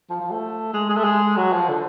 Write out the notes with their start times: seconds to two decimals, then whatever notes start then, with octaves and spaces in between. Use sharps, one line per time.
0.10 F3
0.20 F3
0.31 A3
0.74 G#3
0.89 G#3
0.97 A3
1.04 G#3
1.37 F#3
1.53 F3
1.69 D3